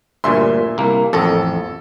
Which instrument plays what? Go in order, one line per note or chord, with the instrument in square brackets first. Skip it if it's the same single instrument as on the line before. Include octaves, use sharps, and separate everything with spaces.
[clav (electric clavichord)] D2 G2 A#2 [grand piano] E5 G#5 C6
[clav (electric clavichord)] C2 A#3
[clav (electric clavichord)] A1 F2 [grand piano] A4